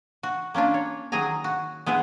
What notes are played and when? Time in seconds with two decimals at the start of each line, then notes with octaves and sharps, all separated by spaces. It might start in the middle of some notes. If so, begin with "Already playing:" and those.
0.23 F#4
0.54 A#3 C#4 D4 F4
0.74 C#5
1.12 D#3 F#3 G#4 G#5 A#5
1.44 F#4
1.86 G#3 B3 E4 G#4